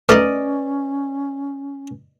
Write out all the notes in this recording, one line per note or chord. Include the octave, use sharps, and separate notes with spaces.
A3 C#4 D#4 B4 D5 D#5